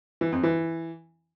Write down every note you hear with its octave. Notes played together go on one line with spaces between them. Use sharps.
E3
F2
E3